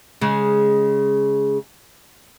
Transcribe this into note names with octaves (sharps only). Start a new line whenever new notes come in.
C#3 G#3